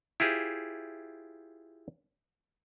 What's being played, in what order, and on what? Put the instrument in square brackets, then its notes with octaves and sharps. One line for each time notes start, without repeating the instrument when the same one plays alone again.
[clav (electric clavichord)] E4 F4 G4 G#4 C5